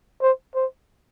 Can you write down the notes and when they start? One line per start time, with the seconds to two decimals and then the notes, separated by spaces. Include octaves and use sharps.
0.22 C5
0.56 C5